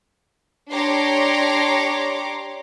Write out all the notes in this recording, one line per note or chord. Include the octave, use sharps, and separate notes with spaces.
D4 G4 C#5 A#5 C6 D6